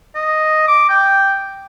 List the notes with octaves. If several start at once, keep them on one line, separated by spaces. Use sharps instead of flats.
D#5
D6
G5